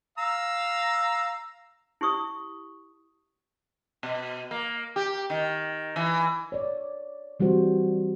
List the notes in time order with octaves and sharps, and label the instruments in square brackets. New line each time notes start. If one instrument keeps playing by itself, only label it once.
[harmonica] F5 A#5 E6
[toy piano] E4 G4 C#6 D#6
[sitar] B2
A#3
G4
D#3
E3
[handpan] C#5 D5
E3 G3 C4 F#4 C5